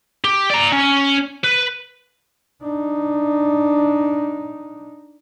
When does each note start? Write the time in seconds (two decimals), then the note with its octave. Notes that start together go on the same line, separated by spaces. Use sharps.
0.24 G4
0.50 D5 A#5
0.72 C#4
1.44 B4
2.62 D4 D#4